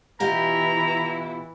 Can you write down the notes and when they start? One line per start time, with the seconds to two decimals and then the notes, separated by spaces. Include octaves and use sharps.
0.20 B2 E3 E4 F4 G4 A#5